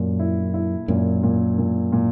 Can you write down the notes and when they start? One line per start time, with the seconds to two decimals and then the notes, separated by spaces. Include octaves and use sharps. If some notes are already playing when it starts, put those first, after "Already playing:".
Already playing: F#2 A#2
0.19 E4
0.54 E4
0.88 F#2 A#2
1.23 A#2
1.58 A#2
1.92 A#2